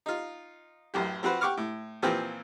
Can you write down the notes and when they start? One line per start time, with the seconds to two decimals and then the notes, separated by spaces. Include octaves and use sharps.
0.06 D#4 F4
0.94 A1 F#2 G4
1.23 F3 C4 F#4 B4 C5
1.41 G4 F#5 C#6 D6 F6
1.57 A2
2.03 A#2 E3 F3 C4 G5